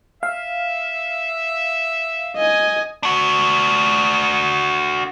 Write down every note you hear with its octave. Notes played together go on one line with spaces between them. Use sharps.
E5 F5
D#5 G#5
D4 F#4